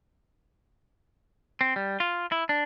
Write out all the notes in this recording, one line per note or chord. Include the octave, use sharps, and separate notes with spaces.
C4
G3
F4
E4
D4